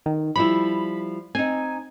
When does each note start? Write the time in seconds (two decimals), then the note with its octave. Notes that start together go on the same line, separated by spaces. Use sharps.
0.06 D#3
0.36 F3 G3 E4 B5
1.35 C4 D#4 G#5